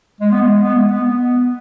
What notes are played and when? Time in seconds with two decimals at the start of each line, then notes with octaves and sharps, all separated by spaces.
0.21 G#3
0.32 B3
0.42 G#3
0.62 B3
0.75 G#3
0.88 B3
1.04 B3